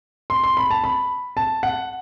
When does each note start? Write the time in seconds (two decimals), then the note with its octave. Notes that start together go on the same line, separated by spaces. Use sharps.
0.30 C6
0.44 C6
0.57 B5
0.71 A5
0.84 B5
1.37 A5
1.63 F#5